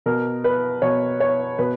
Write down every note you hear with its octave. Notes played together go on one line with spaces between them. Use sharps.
B2 A#4
B4
B2 C#5
C#5
B2 B4